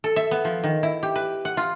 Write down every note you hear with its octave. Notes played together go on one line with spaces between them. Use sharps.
A4
E5
B3
F3
D#3
E4
G4
B4
F#5
F4